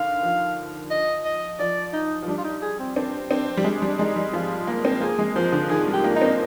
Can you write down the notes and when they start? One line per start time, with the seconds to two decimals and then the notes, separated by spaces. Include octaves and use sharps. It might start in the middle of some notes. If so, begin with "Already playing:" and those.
Already playing: D3 D#3 F5
0.23 F3
0.91 D#5
1.25 D#5
1.59 F3 D5
1.93 D#4
2.23 F3
2.28 G3 D4
2.38 F4
2.44 D#4
2.62 G#4
2.79 C4
2.96 C4 D4
3.31 C4 D4
3.57 G3
3.64 G#3 D4
3.82 G3
3.87 D4
3.99 G#3 D#4
4.16 G3
4.33 F3 F4
4.67 A#3
4.85 C4
5.01 A#3 G#4
5.19 G#3
5.36 F3 C5
5.52 D3
5.69 D#3 G#4
5.87 G3
5.93 G4
6.04 A#3
6.16 D#4
6.22 C4